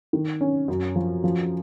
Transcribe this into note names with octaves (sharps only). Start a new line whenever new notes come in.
D#3
C#4
F#2
F3
F3